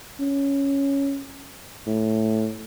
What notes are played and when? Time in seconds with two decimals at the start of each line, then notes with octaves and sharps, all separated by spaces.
0.20 C#4
1.87 A2